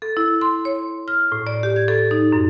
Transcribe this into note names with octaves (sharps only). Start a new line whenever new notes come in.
A4
E4
C6
C#5
F6
A2
D5
G4
G#6
A4
D#4
F#2